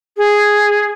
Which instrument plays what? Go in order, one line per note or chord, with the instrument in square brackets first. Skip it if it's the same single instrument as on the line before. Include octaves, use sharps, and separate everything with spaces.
[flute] G#4